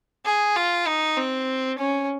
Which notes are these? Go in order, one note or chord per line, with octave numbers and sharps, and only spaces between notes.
G#4
F4
D#4
C4
C#4